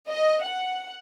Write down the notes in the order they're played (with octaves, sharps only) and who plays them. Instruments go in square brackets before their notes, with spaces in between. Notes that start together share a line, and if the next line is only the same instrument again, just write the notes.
[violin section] D#5
F#5